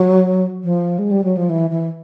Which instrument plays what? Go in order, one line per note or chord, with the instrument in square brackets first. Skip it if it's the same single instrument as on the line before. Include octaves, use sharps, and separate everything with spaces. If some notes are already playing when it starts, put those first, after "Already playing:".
Already playing: [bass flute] F#3
F3
G#3
G3
F#3
F3
E3
E3